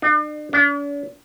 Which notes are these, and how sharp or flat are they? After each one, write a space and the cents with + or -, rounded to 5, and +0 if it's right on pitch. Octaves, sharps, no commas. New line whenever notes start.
D4 +45
D4 -45